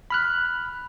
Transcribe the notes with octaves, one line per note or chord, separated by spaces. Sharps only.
B5 F6 F#6